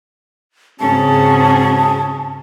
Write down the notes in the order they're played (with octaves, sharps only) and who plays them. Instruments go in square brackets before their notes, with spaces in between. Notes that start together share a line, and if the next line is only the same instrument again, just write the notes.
[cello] G#2 C#4 [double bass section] C#3 [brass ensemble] C4 F#4 G#4 [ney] A5